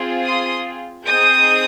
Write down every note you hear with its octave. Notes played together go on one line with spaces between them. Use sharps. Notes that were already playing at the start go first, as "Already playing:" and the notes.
Already playing: C4 F4 G#4
C6 D#6
C4 D#4 G#4 D#6 G6